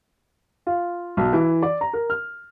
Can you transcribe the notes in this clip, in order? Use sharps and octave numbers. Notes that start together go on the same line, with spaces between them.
F4
B1
E3
D5
A#5
A#4
F6